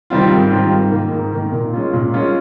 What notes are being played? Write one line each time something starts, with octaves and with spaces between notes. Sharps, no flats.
D#3 G3 C4 F4
G#2
D#3 G3 C4 F4
G#2
D#3 A#3
G#2
D#3 A#3
A#2
G#3 C#4 F4
A#2
G#3 C#4 F4